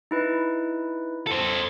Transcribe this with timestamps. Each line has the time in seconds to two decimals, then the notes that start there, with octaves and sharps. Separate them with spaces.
0.11 D#4 E4 B4
1.27 A4 C5